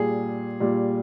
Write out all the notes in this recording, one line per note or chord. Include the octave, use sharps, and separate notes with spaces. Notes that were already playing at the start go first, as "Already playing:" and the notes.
Already playing: A#2 G3 G#4
A#2 G3